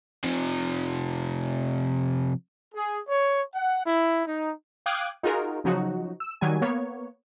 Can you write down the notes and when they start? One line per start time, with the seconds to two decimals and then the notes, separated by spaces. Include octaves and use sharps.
0.24 C3 F3
2.74 G#4
3.09 C#5
3.55 F#5
3.86 E4
4.26 D#4
4.86 F5 G5 D6 D#6 F#6 G#6
5.23 D#4 F4 F#4 G#4 A#4
5.64 C#3 F3 F#3 D#4 F#4
6.20 E6
6.41 D#3 F#3 G3 G#5
6.61 A#3 B3 C#5